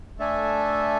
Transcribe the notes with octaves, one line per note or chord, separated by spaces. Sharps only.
A3 D4 A4 E5 G#5